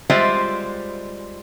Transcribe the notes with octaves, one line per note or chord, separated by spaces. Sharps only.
G3 G#3 F4 C5 D5 E5